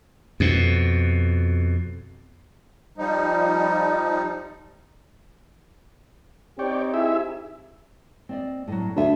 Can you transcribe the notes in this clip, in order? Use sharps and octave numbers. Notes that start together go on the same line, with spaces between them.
F2 B2
F3 G3 D#4
C4 D#4 G4 C#5 D5 G5
E4 G#4 E5
C4 D5 D#5
A2 F#3
D2 A4 E5